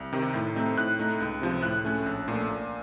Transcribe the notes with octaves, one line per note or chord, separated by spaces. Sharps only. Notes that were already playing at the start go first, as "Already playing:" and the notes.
Already playing: C2
C3 D#3
A2
A3 C4 D#4
A2 F#6
A3 D#4
C#2
C3 F3
A2 F#6
A3 C#4
A#1
A#2 A3
A#2